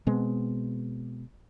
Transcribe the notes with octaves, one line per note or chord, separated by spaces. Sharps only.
B2 G#3 B3 C4